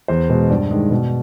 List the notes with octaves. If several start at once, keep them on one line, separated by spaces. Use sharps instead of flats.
E2 C5
B2 G#3
G2 D5
D#3 G#3
B2